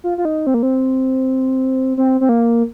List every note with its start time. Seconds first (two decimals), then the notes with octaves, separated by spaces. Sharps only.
0.04 F4
0.18 F4
0.25 D#4
0.47 C4
0.54 A#3
0.63 C4
1.97 C4
2.21 C4
2.29 A#3